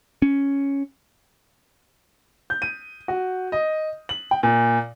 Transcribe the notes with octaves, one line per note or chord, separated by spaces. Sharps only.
C#4
G6
D#7
F#4
D#5
F#7
G5
A#2